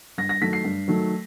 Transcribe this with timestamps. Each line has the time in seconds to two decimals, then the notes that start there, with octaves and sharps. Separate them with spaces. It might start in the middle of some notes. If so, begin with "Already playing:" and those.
0.18 G2 A#6
0.29 A#6
0.41 D#3 F#3 A3 B6
0.53 C7
0.64 G2
0.88 D#3 F#3 A3